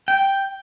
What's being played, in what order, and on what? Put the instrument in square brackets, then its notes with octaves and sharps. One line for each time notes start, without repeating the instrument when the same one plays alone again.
[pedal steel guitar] G5